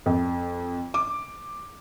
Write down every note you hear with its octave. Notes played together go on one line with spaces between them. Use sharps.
F2
D6